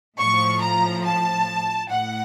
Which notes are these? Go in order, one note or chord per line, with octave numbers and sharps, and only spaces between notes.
A2 F3 C#6
A#5
A5
A2 F#5